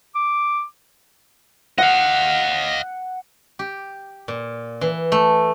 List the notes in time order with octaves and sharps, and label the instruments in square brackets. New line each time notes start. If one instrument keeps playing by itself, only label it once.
[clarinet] D6
[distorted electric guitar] D#5 F5 [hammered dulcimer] F#5
[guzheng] G4
A#2
E3
A3